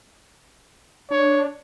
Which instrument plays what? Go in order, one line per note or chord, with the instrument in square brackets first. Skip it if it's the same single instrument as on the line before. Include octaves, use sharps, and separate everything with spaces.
[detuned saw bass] D4 [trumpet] C#5